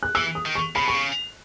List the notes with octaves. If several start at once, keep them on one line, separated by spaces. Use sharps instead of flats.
F#6
E3 E6
D#6
D#3
C#6
C#3 B5
B2 C#6
C#3